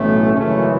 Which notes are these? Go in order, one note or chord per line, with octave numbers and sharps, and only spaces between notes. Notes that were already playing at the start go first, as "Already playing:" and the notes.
Already playing: B1 A2 E3 A3 C#4
G#1 F#2 C#3 E3 A3 C#4